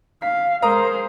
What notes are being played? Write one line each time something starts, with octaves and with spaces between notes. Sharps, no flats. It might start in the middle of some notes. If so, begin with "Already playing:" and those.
F5 B6
G#3 A#4 C5 A#5 D#6